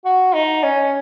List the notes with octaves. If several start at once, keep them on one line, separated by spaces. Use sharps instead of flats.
F#4
D#4
C#4